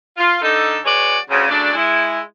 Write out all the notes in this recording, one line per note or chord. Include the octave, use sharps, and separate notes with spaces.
F4
D3 D#4 A4
G#3 F#4 G#4 B4 C#5 D5
D2 C#3
C#3 F#3 A3 D4
G#3 E4